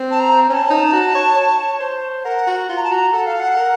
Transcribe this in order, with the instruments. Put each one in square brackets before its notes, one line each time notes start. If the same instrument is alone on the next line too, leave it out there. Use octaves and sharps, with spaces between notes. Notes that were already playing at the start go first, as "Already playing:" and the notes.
Already playing: [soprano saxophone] C4
[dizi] A5
A#5
[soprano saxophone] C#4 [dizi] A#5
[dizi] A5
[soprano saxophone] D#4
F#4
C#5
C#5
C5
[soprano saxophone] A#4 [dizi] F#5
[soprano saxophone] F#4
F4
[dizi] A#5
A5
[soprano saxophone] F#4 [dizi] A#5
[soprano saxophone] A4 [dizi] F#5
[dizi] F5
F#5
[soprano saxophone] A#4